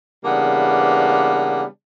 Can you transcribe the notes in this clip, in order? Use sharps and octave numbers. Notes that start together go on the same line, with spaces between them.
C#3 E3 G3 A#3 B3 D4